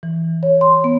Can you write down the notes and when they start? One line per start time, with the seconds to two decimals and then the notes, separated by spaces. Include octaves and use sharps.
0.03 E3
0.43 C#5
0.61 C6
0.84 B3